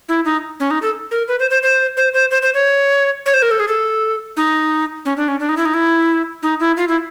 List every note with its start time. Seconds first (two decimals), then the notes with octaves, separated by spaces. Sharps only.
0.09 E4
0.25 D#4
0.60 C#4
0.71 D#4
0.82 A4
1.11 A#4
1.28 B4
1.39 C5
1.51 C5
1.63 C5
1.97 C5
2.14 C5
2.31 C5
2.42 C5
2.54 C#5
3.26 C#5
3.34 C5
3.42 A#4
3.51 A4
3.60 G#4
3.68 A4
4.37 D#4
5.05 C#4
5.17 D4
5.28 C#4
5.40 D4
5.49 D#4
5.57 E4
5.65 D#4
5.74 E4
6.43 D#4
6.60 E4
6.77 F4
6.88 E4